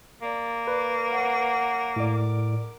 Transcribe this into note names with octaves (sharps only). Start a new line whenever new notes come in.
A#3 D5
B4 D5 D6
C#5 F#5
A2 A#4 D5 D6